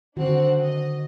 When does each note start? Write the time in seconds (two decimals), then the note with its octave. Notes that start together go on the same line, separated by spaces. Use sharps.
0.17 D3 D#3 C4 D4 F#4 F#5
0.62 D#5